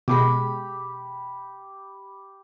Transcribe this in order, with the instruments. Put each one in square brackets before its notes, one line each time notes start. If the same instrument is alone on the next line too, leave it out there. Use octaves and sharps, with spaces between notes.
[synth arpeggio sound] B2 G#3 [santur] G4 B5